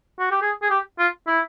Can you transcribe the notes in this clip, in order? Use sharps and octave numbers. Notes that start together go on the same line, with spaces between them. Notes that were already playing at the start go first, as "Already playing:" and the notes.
F#4
G4
G#4
G#4
G4
F4
E4